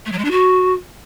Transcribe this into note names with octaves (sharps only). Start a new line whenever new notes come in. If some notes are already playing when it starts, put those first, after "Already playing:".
A3
F#3
G#3
D4
F#4